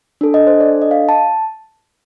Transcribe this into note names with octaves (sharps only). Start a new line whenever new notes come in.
D4 A4
D#5
C5
D5
D#5
F5
A5